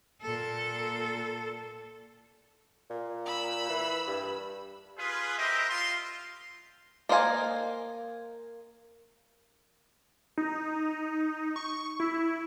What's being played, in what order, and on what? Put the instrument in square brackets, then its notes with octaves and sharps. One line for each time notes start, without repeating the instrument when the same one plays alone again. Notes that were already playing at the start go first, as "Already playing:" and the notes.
[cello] A#2 A4
[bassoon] A#2
[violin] B5 E6
[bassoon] E3
G2
[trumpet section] F4 G#4 B4
E4 G4 A#4 C5 D#5 E5
F4 C6
[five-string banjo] A#3 C5 D#5 F5 G#5
[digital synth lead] D#4
C#6
E4